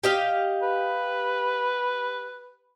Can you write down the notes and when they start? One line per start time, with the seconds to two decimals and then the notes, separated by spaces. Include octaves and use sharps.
0.04 G4 D#5 F5
0.62 B4